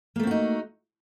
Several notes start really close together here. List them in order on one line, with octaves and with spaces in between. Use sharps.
A#3 A3 C4 F#4 D#4